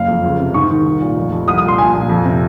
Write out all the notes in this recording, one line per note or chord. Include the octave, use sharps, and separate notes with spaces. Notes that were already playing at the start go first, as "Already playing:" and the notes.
Already playing: F#1 F5
F2
C#2
C3
G#2 C#6
D#3
C2
A#2
F1
F2
C2 D#6
D#6
A#2
C6
A#1 G#5
A#2
F2
C3